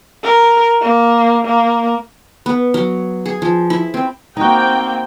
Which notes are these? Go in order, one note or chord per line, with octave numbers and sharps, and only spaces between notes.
A#4
A#3
A#3
B3
F#3
G#4
F3
E4
C4
A#3 C4 D#4 F#4 G5